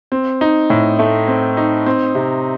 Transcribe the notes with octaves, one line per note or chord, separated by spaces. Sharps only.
C4
D#4
A2
A3
C4
D#4
C4
C3